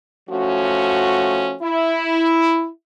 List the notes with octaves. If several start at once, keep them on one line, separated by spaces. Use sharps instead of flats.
F3 A3 C#4 F#4
E4